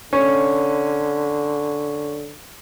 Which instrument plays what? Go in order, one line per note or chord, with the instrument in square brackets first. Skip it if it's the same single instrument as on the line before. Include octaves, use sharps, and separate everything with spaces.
[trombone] D3 [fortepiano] C#4